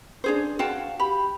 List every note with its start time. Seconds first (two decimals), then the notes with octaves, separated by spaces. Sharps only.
0.24 D4 G#4 C5
0.59 F#4 F5 G5 A5
0.99 G4 B5